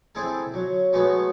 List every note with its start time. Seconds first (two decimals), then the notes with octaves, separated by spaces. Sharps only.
0.15 C4 E4 G#4 A4 A5
0.54 F#3
0.93 F#3 G#3 A3 B3 F#4